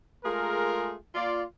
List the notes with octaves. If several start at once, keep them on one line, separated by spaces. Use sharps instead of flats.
G#3 A3 F4 G#4 A#4
A#3 F4 D5